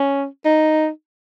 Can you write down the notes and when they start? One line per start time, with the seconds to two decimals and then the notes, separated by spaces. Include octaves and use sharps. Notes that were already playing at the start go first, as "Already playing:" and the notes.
Already playing: C#4
0.45 D#4